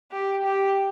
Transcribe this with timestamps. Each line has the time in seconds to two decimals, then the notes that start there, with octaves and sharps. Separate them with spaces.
0.12 G4
0.44 G4